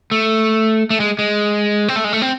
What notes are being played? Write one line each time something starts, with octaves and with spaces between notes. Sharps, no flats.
A3
A3
G#3
G#3
C4
A3
G#3
A3
C4